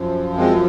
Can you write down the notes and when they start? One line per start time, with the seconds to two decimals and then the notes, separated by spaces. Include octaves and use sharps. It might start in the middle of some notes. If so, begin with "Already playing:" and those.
Already playing: F#2 F3
0.37 G#3 C4